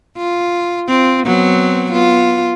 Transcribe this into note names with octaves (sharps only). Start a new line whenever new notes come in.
F4
C4 F4
F#3 B3 C4
B3 F4